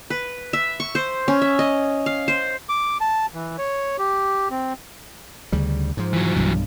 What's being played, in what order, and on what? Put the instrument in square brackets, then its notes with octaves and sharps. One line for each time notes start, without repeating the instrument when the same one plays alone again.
[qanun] B4
E5
C#6
C5
C#4
E5
D#5
F5
C5
[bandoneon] D6
A5
E3
C#5
G4
C4
[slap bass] D2 C#3 G3
G#2 F3
[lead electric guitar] E3 F#3
[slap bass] B1 G2